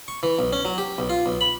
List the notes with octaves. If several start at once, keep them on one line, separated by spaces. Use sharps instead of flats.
C#6
E3
B1
C#4
F#3
G4
B1
F4
B1
B5